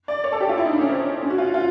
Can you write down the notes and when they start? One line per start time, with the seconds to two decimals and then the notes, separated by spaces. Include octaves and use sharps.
0.08 D5
0.24 C#5
0.32 A4
0.40 G4
0.49 F4
0.57 E4
0.65 D#4
0.72 D4
0.81 C#4
0.90 C4
1.22 C#4
1.30 F#4
1.38 F4
1.54 F4